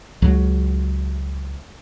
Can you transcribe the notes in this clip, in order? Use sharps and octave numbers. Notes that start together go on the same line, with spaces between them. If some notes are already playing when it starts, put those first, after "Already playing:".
C#2 F#3